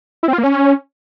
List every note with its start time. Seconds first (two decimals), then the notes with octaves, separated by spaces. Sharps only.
0.23 E4
0.28 C4
0.33 F4
0.38 A#3
0.43 C#4